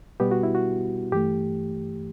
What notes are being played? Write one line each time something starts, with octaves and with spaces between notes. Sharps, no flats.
B2 G3 B3 G4
F#4
E4
F#4
G2 E3 A3 G4